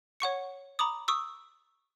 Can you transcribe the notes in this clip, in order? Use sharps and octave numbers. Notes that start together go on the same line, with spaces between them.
C#5 F#5 C#6 C#7
A#5 B5 D6 D#6
C#6 D#6 E6